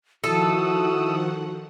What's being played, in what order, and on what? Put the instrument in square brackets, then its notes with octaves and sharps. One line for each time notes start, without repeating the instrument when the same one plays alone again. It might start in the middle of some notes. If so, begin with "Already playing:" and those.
[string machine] D#3 F3 F#5 [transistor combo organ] E4 D#6 E6 [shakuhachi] F#4 [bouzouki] A4